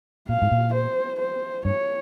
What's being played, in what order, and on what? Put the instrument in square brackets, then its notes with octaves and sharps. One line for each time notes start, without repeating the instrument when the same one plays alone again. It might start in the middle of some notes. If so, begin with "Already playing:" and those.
[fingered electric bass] A#2 [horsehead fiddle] F5
[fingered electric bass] G#2
A#2
[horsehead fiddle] C5
C5
[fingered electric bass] G2 [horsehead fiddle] C#5